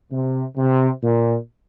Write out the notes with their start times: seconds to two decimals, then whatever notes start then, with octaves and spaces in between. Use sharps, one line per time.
0.12 C3
0.57 C3
1.04 A#2